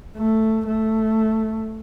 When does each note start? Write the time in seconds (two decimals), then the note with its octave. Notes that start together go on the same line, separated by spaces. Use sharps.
0.17 A3
0.66 A3